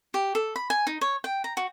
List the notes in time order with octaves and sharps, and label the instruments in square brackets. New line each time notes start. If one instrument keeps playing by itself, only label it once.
[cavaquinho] G4
A4
B5
G#5
D#4
C#5
G5
A#5
F#4